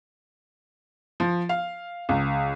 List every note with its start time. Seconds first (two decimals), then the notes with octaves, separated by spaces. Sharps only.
1.20 F3
1.49 F5
2.09 C#2